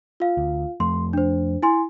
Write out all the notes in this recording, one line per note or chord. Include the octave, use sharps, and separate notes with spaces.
F4 F5
D2
F2 F3 A3 C6
D4 C5
E4 G#5 C6